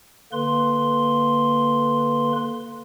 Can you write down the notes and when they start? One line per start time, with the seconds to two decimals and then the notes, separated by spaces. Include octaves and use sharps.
0.32 D3 A#3 B4 C6